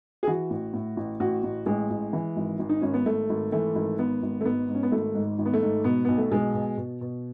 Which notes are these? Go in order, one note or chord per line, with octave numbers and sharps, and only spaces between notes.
G#4
E3 F#4
A1
A2
A1
A1 F#4
A1
A1 G#3
A1
E3
G#1
G#1
D#4
G#1 C#4
B3
G#1 A3
G#1
E3 A3
G#1
G#1 B3
G#1
A3
G#2 B3
G#2
C#4
B3
G#1 A3
G#2
G#1
B3
A3
G#2
B2 B3
B1 B3
A3
B2 G#3
B2
B2
B2